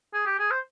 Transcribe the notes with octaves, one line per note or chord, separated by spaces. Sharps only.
G#4
G4
G#4
C5